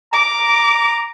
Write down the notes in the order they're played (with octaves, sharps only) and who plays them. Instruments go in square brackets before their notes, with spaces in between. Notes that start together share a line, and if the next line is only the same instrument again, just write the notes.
[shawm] A#5 [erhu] D6